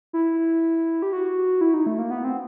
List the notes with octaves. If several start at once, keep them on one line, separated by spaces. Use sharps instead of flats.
E4
G4
F#4
E4
D#4
A3
A#3
B3
C4